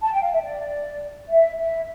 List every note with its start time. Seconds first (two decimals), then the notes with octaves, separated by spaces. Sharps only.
0.02 A5
0.12 G5
0.22 F5
0.32 E5
0.42 D5
1.30 E5
1.59 E5